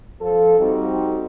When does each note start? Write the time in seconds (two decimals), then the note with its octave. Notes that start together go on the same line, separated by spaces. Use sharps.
0.21 F3 A4
0.59 G3 C4 D#4 F#4